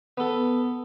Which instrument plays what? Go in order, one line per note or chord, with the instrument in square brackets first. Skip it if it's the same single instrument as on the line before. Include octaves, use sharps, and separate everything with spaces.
[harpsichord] B3 A4